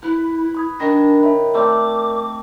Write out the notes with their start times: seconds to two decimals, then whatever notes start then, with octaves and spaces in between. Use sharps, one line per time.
0.03 E4 B4
0.55 B5 D#6 G#6
0.80 D#3 D4 B5 A#6
1.23 C#5 E5 B5
1.54 A3 C4 A#4 D5 E5 D6